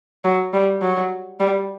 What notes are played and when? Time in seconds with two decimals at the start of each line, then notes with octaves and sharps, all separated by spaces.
0.25 F#3
0.54 G3
0.82 F#3
1.40 G3